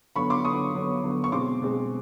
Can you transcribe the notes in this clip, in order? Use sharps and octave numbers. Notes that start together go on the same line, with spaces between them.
D3 F#3 B3 B5 C#6
C6 D6
D3 F#3 B3 C#6 D#6
D3 F#3 B3
D3 F#3 B3
C#6
B2 G#3 C4 C6 D6
B2 G#3 C4